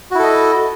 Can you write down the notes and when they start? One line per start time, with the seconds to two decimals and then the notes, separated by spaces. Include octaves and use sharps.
0.11 F#4
0.15 E4
0.19 A4
0.23 D#5